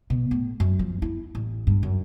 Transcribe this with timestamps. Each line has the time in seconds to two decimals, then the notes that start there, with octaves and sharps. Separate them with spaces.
0.10 B2
0.31 A2
0.60 F#2
0.79 F3
1.02 E4
1.35 A1
1.67 G2
1.83 F#2